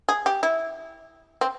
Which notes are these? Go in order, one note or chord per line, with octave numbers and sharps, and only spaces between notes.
G#4
G4
E4
C4